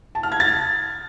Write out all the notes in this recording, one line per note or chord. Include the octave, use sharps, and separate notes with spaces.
A5
F6
G#6
A6